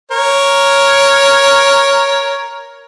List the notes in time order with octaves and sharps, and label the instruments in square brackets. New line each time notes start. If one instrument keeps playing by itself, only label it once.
[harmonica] A#4 C#5